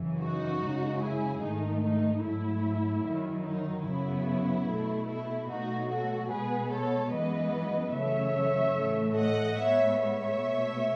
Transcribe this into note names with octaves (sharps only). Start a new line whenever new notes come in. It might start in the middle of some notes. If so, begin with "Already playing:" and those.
Already playing: F#2 C#3 E3
D#4 F#4
F#2 C#3 G#3
E4 G#4
G#2 D#3 A3 D#4
D#4
G#2 F#3 A3 E4
F#2 D#3 F#3
D#4
F#2 C#3 F#3 B3 E4
B2 A3
E4
B2 F#3 A3 D#4 F#4
F#4 A4
B2 G#3 B3 G#4 B4
A4 C#5
F#2 E3 G#3 B3 B4 D#5
F#2 C#3 E3 A3 C#5 E5
A2 E3 A3
D#5 F#5
A2 G#3 B3 C#5 E5
C#5 E5
B2 A3